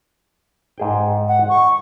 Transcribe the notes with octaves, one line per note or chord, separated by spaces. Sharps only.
G#2 G#4 G5
F#5
C#6